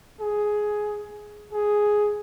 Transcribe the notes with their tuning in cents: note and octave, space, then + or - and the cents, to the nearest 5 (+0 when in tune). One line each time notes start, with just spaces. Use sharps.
G#4 +10
G#4 +5